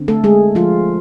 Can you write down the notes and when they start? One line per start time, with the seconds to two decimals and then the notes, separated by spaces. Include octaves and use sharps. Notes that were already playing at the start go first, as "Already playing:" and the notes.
Already playing: D3 C4
0.08 A3 A4
0.24 G#3 G#4
0.55 F3 F4